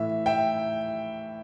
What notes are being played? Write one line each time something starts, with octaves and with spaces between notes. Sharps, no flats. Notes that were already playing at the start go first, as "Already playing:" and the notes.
Already playing: A2 E3 E5
E5 G5